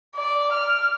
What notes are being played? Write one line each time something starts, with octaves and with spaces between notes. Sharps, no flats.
D5
F6